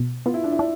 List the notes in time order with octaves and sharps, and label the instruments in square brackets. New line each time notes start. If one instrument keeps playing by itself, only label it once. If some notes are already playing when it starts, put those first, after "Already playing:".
Already playing: [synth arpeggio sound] B2
[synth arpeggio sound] B3 [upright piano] F4
[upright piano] E4
D4
E4
[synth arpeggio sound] D4